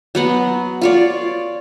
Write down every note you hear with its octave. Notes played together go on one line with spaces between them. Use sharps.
F#3 B3 F#5
F4 C#5 D5